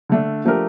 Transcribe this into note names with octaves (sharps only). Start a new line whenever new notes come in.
D3 A3 D4
F3 A3 D4 G4 A#4